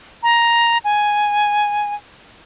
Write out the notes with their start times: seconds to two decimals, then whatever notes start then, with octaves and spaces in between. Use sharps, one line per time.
0.23 A#5
0.84 G#5